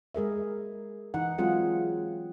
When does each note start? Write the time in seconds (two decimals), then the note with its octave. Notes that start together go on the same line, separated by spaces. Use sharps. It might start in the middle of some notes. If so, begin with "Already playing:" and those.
0.15 G#3 G#4 A#4 E5
1.14 E3 D#4 F#5
1.38 F#3 G#3 C4 F4 G#4 F#5